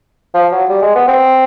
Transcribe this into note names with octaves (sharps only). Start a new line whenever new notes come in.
F3
F#3
G3
G#3
B3
C4